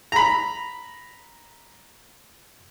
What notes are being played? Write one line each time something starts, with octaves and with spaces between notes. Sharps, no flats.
A#5 B5